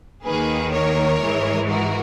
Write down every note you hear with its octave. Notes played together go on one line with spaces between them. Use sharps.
D#2 D#3 A#3 G#4 B4
A#4 C#5
G#2 E3 G#3
F#4 A#4